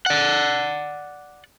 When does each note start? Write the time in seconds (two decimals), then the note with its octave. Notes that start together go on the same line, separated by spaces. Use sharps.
0.06 D5 F#5